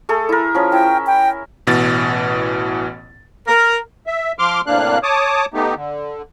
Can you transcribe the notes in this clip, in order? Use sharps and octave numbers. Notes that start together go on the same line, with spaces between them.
A3 G#4 A4
E4 A#4
F3 C#4
E4 G5
G5
A1 B2 E3 A6
A#4
E5
F3 C6 D6 F6
A2 C3 A#3 D4 F5 F#6
C#5 A5 D6 D#6
A3 B3 D#4 G4
D3